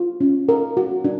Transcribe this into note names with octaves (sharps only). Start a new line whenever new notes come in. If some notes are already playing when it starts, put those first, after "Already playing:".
Already playing: F4
C#4
A#4
F#4
D4